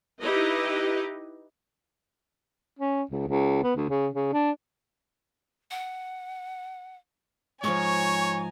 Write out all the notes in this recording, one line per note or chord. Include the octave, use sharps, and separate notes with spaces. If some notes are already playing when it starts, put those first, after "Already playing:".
D#4 E4 G4 B4 D#5
C#4
C#2
C#2
B3
D2
C#3
C#3
D4
F#5
G#2 F3 C#5 G#5 A#5 C#6